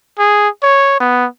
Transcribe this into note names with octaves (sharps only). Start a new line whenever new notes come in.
G#4
C#5
B3